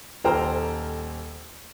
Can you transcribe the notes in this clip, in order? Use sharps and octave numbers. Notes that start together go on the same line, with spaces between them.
D#1 A4 C5 G5 A#5 F6